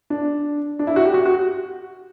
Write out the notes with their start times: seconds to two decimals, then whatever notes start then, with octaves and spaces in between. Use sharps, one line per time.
0.10 D4
0.79 D4
0.87 E4
0.96 F#4
1.05 G4
1.14 F#4
1.26 F#4